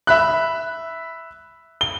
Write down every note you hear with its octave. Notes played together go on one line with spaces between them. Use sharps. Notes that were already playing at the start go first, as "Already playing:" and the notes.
E5 B5 F#6
G7